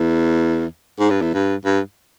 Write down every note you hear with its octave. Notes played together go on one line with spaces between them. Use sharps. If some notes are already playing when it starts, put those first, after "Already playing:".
Already playing: E2
G#2
G2
E2
G2
G2